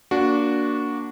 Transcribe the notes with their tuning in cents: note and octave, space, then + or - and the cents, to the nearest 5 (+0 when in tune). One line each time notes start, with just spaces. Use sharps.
A#3 +0 D4 -15 F#4 -5